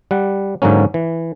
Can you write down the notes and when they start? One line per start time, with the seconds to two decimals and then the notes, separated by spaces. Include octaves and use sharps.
0.11 G3 F#5
0.62 G#2 D3 F#3 A#3 C#4
0.94 E3